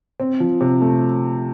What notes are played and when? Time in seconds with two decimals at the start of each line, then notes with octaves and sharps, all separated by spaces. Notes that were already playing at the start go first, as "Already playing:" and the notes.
0.20 C4
0.40 F3
0.61 C3
0.81 A3